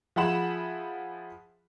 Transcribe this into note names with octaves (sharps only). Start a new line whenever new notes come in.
F3 G#4 E5 F#5 B5 E7